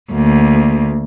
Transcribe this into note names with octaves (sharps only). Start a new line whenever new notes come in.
D2 A#3